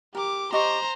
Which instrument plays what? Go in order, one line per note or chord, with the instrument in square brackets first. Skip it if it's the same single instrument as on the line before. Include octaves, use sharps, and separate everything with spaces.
[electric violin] G4 D6 [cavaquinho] A#4
[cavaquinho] G4 D#5 C#6 [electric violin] C5 A#5